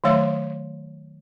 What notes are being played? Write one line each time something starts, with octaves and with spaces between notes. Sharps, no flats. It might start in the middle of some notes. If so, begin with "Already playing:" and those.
D#3 F#3 A3 C#5 E5 C6